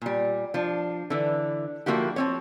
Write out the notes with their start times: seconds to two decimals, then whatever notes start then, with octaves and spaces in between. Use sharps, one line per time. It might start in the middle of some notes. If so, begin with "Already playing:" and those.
0.02 A#2 G3
0.54 F3 D4
1.10 D3 E3
1.86 D3 F3 A#3 E4 F#4 G4
2.16 F3 C4 C#5